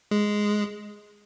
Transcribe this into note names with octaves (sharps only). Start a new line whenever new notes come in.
G#3